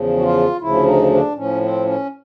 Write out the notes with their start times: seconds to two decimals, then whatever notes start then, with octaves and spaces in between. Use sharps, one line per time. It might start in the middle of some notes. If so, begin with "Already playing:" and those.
Already playing: E2 C#3 F3
0.18 F#4
0.23 F4
0.61 D2 C#3 F3 E4
0.86 D#4
1.11 D4
1.36 A2 F3 C#4
1.61 C4
1.85 C#4